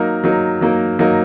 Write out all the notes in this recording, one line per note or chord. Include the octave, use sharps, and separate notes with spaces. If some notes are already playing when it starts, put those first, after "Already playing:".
Already playing: F#3 A#3 D#4 A#4
F#3 A#3 D#4 A#4
F#3 A#3 D#4 A#4
F#3 A#3 D#4 A#4